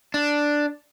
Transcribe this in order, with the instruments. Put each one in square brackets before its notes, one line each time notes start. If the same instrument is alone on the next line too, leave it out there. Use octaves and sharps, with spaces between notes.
[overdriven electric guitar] D4